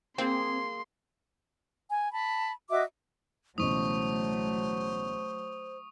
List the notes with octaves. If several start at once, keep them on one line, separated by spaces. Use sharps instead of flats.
A#3 C4 G#4 C6
G#5
A5 B5
F#4 D#5 E5 D6
C#2 B2 E3 F#3 A3 C5 C#6 D#6